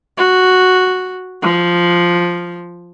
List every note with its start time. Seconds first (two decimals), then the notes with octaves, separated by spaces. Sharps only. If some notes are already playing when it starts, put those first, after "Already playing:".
0.17 F#4
1.42 F3